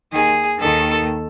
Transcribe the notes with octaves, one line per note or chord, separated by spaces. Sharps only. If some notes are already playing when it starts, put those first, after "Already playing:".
D#2 D#3 G#4
D#2 D#3 A4